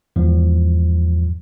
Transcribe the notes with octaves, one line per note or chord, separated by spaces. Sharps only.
E2 G#2 F3